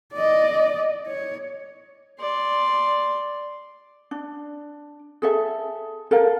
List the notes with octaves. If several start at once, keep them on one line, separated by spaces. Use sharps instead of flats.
D5 D#5
C#5
D5 C6
D4
G#4 A4 E5
A4 A#4 F5